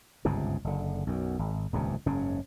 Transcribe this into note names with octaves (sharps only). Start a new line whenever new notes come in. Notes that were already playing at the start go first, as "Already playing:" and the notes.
G1 C#2 G#2 C3
F#1 D3
B1 F#2
G#1
D#1 C#2 G2 C3
F#1 G#2 C#3 C#4